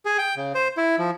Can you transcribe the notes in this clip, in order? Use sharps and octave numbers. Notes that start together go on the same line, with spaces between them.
G#4
G5
C#3
C5
E4
F3